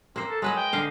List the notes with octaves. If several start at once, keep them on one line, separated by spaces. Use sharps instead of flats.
A#3 C4 C5
A4
F#3 G#3 B4 D#5
G5
D3 D#5 F5